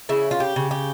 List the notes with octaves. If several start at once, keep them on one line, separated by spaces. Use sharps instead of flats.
C#3 E4
F4
G4
C#3
G4